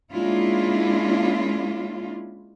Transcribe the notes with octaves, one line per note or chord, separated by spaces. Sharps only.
G#3 A#3 C#4 D4 E4 F4